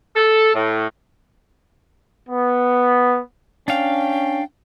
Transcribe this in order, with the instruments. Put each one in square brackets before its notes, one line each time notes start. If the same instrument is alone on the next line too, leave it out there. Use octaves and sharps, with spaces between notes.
[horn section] A4
A2
[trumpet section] B3
[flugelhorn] C#4 [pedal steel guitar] D4 F5 [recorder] G5